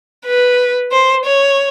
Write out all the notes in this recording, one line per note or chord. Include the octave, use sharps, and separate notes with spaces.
B4
C5
C#5